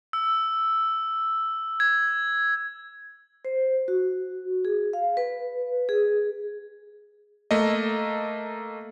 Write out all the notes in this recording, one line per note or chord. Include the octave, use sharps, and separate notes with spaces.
E6
G#6
C5
F#4
G#4
F5
B4
G#4
A3 A#3 D#5